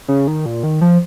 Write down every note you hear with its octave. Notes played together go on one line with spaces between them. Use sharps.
C#3
D#3
A#2
D#3
F3